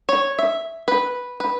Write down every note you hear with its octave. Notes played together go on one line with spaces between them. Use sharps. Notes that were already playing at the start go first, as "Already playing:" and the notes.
C#5
E5
B4
B4